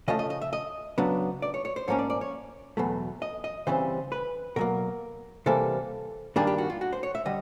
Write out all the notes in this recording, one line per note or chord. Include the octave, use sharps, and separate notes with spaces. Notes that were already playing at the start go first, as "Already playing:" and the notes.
C#3 F3 A3 D#5
D#5
D#5
E5
D#5
C#3 F#3 B3 D4
D5
C#5
C#5
C5
G#2 F3 A#3 C#4 C#5
D5
D5
C#5
E2 B2 F#3 A3
D#5
D#5
C#3 E3 G3 C4 C5
B4
B2 F#3 A#3 A#4
C3 E3 G3 A#3 A4
G2 D#3 G3 A#3 D4 G#4
G4
F#4
F4
F#4
C5
C#5
E5
D3 G3 D#5